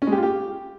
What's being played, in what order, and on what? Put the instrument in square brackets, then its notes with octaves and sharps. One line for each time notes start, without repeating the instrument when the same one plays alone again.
[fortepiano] C#4
G#3
G4
F4
G4